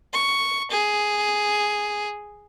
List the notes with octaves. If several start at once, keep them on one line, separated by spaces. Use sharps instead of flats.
C#6
G#4